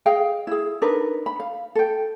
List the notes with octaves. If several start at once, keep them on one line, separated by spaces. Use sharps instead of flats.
G#4 D#5 F5 G5
E4 G#4
D4 D#4 A#4 B4
B5
F5
A4 G5